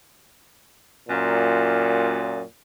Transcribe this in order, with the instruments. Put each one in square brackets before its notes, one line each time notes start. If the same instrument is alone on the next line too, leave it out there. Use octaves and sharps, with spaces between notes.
[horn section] F#2 A#2